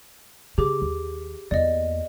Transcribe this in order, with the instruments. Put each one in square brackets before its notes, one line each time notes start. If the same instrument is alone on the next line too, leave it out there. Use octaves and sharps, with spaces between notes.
[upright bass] C#3 [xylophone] G4 G#4 D6
[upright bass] D#2
[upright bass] E2 A#3 [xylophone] D5 D#5